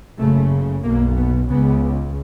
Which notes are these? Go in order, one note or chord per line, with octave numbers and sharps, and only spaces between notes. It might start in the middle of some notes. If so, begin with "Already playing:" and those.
F#1 F#2 C#3 A3
B1 B2 A#3
B3
C#2 C#3 B3